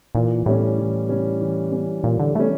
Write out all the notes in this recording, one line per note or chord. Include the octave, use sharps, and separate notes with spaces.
A#2 E3
A2 G3 C#4
E3
G3 C#4
E3
G3 C#4
A#2 E3
D3
G3 A3 C#4